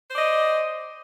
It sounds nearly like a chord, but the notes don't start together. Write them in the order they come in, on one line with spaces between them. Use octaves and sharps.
C5 D5 D#5